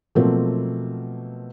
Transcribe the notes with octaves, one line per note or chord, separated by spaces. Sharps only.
B2 F3 F#3 A3 A#3 C4